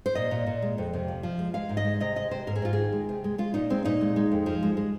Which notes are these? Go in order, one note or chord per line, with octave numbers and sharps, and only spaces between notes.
C5
A#2 D#5
A#2
A#2
G#3
F2
C3
F3
F3
G#3
G#3 F5
G#2
D#5
G#3
C3 D#5
G#3 D#5
C3 C5
G#2 A#4
G#4
G#2 F4
D#3 G#4
G#3
C3
G#3
G#3 F4
A#2 D#4
G#3 C4
A#2 D#4
G#3
G#3
F2
F3
G#3
G#3